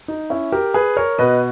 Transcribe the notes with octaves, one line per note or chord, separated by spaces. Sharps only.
D#4
C#4 E4
G4 A#4
G#4 B4
A#4 C#5
B2 B4 D#5